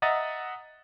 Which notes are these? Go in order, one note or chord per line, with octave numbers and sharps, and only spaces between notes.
D#5 E5 F#5 A#5 D#6 A6